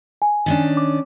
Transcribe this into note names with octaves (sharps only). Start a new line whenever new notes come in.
G#5
D#3 C#4 D4
D6